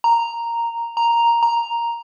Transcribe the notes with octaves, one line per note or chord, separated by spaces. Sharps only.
A#5
A#5
A#5